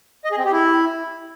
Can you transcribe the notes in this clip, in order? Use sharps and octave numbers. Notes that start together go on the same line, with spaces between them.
D#5
G#4
C4
G4
E4